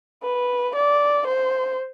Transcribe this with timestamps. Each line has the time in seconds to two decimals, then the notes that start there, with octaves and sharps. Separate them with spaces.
0.23 B4
0.75 D5
1.28 C5